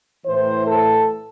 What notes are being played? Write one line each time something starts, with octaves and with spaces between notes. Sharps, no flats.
A2 E3 C5
A4